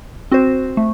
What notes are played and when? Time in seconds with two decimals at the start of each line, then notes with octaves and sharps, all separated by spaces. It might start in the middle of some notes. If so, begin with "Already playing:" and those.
0.32 C4 F#4 C5
0.77 A3